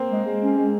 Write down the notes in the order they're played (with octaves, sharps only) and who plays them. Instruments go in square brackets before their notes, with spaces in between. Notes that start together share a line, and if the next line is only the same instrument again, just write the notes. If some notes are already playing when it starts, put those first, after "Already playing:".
Already playing: [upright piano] A#3 C4 C5
[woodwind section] G#3
G#3
C#4
G#3